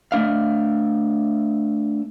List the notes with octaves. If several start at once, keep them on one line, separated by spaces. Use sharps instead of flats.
A3 D4 F5